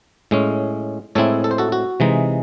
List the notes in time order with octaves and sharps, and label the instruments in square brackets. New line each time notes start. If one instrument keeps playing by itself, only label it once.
[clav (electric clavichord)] A2 G#3 C#4
A2 G#3 C4 E4 A4 C#5
A4
C5
F#4 A4
F#4
C3 E3 G#3 D#4